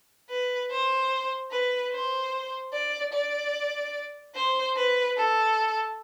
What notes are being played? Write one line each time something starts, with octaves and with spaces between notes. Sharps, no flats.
B4
C5
B4
C5
D5
D5
C5
B4
A4